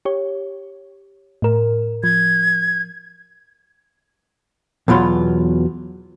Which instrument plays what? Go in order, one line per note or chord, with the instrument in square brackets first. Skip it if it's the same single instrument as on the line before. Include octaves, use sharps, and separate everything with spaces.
[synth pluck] G4 C#5
A2 A#4
[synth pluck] F3 [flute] G#6
[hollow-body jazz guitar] E2 B2 F#3 F4